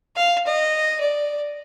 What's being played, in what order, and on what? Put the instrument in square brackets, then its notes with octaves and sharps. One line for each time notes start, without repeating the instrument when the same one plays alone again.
[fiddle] F5
D#5
D5